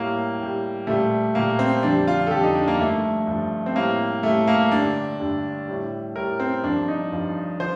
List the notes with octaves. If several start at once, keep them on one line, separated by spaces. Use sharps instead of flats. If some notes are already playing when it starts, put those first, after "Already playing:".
Already playing: A2 G3 A#3
A2 G3
A#2 G3 A3
A#2 G3 A#3
C4
F2 D3 G3 D4
F4
A4
F2 D3 G3 G4
D#4
D4
A#3
G2 F3 A3
G2 F3
C4
A2 G3 A#3
A2 G3 A3
A#3
G2 D3 G3 D4
G2 D3 G3
A2 G3
A2 G3 A#4
C4
G2 F3 D4
D#4
G2 F3
F3 C5